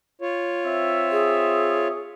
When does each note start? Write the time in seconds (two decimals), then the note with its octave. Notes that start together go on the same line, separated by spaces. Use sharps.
0.21 F4 C#5
0.65 C4 E5
1.11 G#4